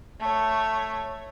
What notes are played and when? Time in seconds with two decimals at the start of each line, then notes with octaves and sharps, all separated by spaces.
0.20 A3 C#5